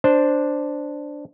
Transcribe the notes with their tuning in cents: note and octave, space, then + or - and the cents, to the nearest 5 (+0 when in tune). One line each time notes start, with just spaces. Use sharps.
D4 +0 C5 +0